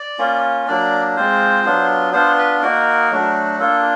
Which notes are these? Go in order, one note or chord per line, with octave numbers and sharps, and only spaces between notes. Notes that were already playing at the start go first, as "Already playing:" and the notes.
Already playing: D5
A#3 C#4 F4
F#3 A#3 D4 D5
G#3 C4 F4 C5
F#3 B3 D4 F4
B3 D4 F4 C5
B4
A#3 D#4 F#4 A#4
F#3 A3 D4 F#4
A#3 D4 F4 A4